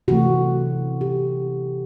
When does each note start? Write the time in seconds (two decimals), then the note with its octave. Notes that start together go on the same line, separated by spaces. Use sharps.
0.08 C3 E3 A3 F#4
1.01 G4